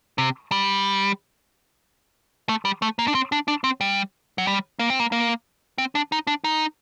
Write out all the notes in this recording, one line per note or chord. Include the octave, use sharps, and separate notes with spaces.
C3
G3
A3
G3
A3
A#3
D4
C4
D4
D4
C4
G3
F#3
G3
A#3
C4
A#3
A#3
C4
D4
D#4
D4
D#4